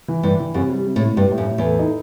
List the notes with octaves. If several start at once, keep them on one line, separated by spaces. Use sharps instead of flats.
E3
G2 E3
E3
F#2 C3
G3
C3
A2
C3
G2 G3
A2
F#2
A2
E2
A4
D#4